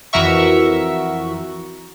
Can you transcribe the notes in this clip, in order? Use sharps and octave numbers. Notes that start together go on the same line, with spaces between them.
F2 E3 F#4 A#4 E5 C#6